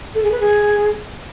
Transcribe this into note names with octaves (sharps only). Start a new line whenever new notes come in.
A4
G#4
B4
G#4